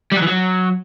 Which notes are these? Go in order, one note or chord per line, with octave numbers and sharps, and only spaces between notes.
G3
F#3
E3
F#3